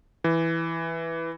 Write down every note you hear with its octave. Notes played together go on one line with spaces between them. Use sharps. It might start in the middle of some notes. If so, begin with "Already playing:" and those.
E3